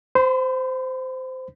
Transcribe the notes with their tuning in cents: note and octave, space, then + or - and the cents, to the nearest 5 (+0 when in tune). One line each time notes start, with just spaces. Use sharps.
C5 -15 B5 +40